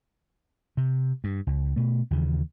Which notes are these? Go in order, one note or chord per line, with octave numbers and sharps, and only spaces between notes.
C3
G2
C#2
B2 A3
D#2 C#3 E3